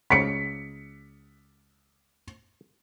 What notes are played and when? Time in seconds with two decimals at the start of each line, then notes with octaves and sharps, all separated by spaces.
0.10 C#2 C#3 B6 C#7